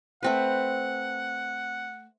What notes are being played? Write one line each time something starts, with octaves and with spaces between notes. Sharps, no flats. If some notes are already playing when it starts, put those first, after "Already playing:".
A3 C4 B4 F#5